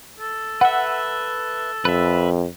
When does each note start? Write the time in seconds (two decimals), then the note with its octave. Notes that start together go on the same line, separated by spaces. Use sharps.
0.20 A4
0.61 B4 E5 F#5
1.85 F2 B4 E5